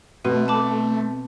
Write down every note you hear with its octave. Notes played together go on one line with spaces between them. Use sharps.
B2 A3 C4
A5 B5 D6